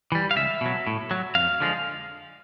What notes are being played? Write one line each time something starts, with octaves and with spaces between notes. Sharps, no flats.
E3 G3
F5
C#2 E5
B2 F#3
A2
F#3
F2 F5
D3 F3 G#3